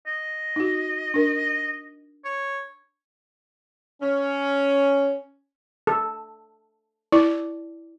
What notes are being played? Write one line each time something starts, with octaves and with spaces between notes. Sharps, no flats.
D#5
D#4 F#4
D4 A#4
C#5
C#4
A4
E4 D5